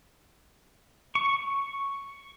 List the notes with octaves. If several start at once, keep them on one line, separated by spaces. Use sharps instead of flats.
C#6